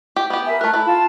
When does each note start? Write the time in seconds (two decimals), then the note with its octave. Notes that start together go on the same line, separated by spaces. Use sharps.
0.16 G4
0.30 B3 G4
0.46 A#4 E5 G#5
0.61 A3 A#4 F#6
0.74 E4 A4
0.86 F4 A5